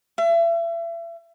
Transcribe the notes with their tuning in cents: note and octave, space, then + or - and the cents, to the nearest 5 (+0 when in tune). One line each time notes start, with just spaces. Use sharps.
E5 +35